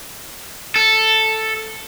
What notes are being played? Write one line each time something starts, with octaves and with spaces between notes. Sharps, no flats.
A4